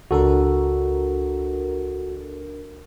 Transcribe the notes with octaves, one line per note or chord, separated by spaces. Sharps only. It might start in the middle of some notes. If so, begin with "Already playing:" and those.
C#2 D4 F#4 A4 A#4